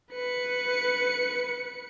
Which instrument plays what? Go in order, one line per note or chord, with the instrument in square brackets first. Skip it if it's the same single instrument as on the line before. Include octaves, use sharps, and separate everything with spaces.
[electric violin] B4 C#7